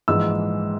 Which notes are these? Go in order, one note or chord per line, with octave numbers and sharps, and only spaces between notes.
A#1 G#2 E3 G#3 E6